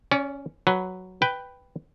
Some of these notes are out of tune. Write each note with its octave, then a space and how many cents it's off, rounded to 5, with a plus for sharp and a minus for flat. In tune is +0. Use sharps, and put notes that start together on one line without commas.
C#4 +0 D5 -35
F#3 +0 B4 +0
B4 +5 G5 +0